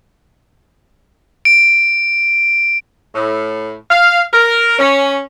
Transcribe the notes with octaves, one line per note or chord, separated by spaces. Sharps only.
D7
A2
F5
A#4
C#4